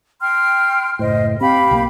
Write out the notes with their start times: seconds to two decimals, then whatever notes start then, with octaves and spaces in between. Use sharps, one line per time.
0.21 G5 C6 F6
0.99 F#1 A2 C5 D#5
1.41 C4 G4 F5 B5
1.71 B1 D#3 A#3